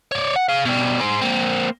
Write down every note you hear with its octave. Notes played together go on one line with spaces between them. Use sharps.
C#5 D5
F#5
G#4 F5
B2 G3
G#4 C5
A#3 C4